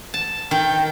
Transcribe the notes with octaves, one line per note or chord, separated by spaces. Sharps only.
A5
D#3 G5